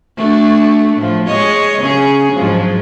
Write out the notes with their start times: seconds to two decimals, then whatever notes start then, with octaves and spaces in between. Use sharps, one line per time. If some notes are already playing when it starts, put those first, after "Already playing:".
0.17 A3 D4 F#4
0.97 A2 F3
1.27 G#3 C#5 D#5
1.79 C#3 C#4 G#4
2.32 G#2 F3 F#3